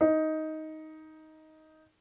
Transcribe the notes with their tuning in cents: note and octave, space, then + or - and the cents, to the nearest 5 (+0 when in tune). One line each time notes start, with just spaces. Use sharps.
D#4 +10